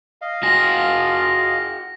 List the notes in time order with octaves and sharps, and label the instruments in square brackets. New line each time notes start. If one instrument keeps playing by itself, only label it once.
[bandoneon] D#5 F5
[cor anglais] F4 [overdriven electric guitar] F#4 G#4 [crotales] A#6